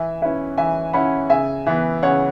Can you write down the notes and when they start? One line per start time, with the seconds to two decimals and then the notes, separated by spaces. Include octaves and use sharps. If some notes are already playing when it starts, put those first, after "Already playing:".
Already playing: E3 E5 G#5
0.22 C#4 E4 B4 E5
0.57 E3 E5 G#5
0.93 C#4 E4 F#5 B5
1.30 C#3 E5 G#5
1.66 E3 B3
2.03 C#3 C#5 F#5